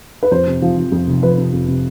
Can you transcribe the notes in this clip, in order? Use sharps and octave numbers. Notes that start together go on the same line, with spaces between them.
B4
F2 C5
C3
F3
F3
F2
F1
F3 B4
C3
F2
C3